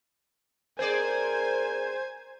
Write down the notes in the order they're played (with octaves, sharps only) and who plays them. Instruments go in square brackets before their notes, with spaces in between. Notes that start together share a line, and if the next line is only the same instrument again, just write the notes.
[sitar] C4 G#4 D5 [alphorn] A#4 [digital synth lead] C5 [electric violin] G#5 G#6